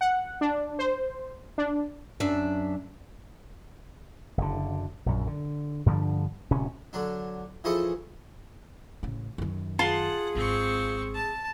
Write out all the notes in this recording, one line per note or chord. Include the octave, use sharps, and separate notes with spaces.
F#5
D4
C5
D4
F#2 D4 E5
F#1 D3
A#1 F#2
D3
G2 D3 F3 G3
D1 C3 C#4
D3 F#3 D4
E3 F3 G#4 A4 D#5 C#6
A1 C#3
F#2 D#3
F4 G#4 F#5 A5 C6
G#1 C4 C#6
A5